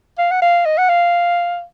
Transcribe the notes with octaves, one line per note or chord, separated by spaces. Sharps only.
F5
F#5
F5
D#5
F#5
F5